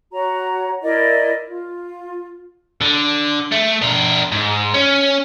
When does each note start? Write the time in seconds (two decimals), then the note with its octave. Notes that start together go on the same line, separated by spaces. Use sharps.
0.13 F#4 C#5 A#5
0.83 E4 A#4 D5 D#5
1.48 F4
2.81 D3
3.52 A3
3.82 D4 A#4
4.32 G#2
4.74 C#4